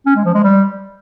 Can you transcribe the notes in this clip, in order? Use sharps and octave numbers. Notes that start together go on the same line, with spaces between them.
C#4
G#3
F3
G#3
G3